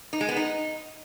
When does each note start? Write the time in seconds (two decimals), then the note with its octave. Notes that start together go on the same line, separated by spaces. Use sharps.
0.13 D#4
0.21 G#3
0.29 B3
0.37 D#4